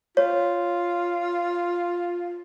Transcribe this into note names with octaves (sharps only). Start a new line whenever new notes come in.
F4 C#5